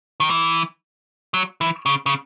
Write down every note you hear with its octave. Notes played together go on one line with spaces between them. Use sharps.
D#3
E3
F#3
E3
C#3
C#3